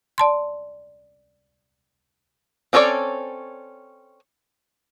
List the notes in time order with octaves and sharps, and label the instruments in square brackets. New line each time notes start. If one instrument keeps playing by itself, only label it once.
[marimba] D5 A5 C6
[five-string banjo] C4 C#4 A4 C#5 D5